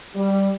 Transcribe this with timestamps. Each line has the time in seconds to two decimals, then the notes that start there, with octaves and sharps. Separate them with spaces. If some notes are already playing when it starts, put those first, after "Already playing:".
0.16 G3